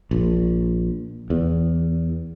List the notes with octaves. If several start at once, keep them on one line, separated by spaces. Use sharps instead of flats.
A#1
E2